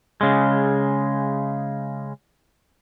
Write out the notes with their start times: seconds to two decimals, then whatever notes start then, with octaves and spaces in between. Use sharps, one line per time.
0.21 C#3 G#3